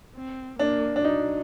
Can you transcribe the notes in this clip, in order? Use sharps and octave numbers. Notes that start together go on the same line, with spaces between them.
C4
A#3 D4
D4
F#3 D#4